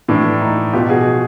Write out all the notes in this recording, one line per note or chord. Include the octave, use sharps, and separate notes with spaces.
A2 E3 D4
D#4
B2 F4 G4
F#4 G#4